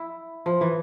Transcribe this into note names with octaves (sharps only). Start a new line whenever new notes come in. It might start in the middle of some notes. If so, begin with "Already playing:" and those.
Already playing: E4
F3
E3